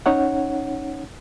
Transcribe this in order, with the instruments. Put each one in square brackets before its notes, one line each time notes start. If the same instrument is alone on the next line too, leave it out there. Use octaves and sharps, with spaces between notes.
[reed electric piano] C#4 D#4 C#5 F#5